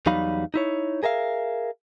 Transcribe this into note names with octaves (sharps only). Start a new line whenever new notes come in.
E2 F#3 G3 D#4 F5 B5
D#4 E4 C#5
G#4 A#4 E5 F5